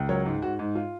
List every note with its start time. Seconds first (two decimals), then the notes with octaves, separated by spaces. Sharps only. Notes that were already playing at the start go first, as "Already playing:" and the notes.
Already playing: C#2
0.09 F#3 A#4 C#5
0.26 G#2
0.42 G#2 F#4
0.59 G#2
0.75 F4